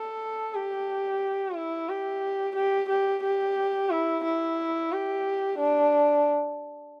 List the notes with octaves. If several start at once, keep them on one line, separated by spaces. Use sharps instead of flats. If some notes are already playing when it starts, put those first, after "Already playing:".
Already playing: A4
G4
E4
G4
G4
G4
G4
E4
E4
G4
D4